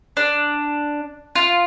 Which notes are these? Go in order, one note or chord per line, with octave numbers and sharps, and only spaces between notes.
D4
F4